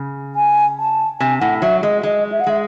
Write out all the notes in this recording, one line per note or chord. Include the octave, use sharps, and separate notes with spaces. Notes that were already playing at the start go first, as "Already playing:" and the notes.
Already playing: C#3
G#5
A5
C3 G#5
A2 F#5
F#3 E5
G#3 D#5
G#3 D#5
E5
F#5
G#3 E5